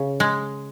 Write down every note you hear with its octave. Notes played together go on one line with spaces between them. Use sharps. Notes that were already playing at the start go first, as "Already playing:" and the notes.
Already playing: C#3
G#3